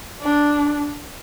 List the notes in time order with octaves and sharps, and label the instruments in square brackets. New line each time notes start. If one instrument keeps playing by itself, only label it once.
[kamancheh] D4